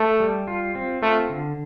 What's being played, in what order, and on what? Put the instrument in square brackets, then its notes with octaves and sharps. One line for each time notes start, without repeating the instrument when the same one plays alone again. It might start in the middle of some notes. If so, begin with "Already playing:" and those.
Already playing: [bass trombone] A3 [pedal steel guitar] A4
[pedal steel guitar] G3
F4
C4
[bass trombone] A3 [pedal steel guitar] F4
[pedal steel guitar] D3